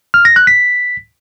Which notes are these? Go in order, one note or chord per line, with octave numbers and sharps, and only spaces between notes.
F6
A#6
F#6
B6